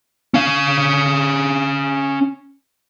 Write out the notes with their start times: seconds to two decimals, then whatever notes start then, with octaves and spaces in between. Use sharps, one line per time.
0.34 C#4 F5